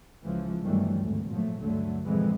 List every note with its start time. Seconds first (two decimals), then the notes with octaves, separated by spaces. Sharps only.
0.24 C#2 E3 F3
0.63 G1 D#3 E3 F#3 G3 A3
1.01 G#1 D2
1.30 A#2 F3 F#3 A3
1.60 D2 G2 D3 F#3 A3
2.06 F2 A#2 D3 E3 G#3